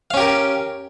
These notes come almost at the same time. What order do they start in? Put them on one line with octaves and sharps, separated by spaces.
F5 C#4 G4 A#4